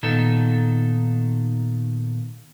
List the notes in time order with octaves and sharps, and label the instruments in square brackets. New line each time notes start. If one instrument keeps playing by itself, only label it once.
[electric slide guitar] A#2 D#3 B3 D#4 A4